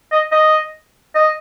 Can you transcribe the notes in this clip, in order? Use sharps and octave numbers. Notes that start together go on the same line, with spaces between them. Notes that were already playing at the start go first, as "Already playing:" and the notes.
D#5
D#5
D#5